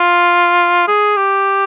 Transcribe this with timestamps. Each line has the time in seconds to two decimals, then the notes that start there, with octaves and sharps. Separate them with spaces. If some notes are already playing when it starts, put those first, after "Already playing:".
Already playing: F4
0.88 G#4
1.17 G4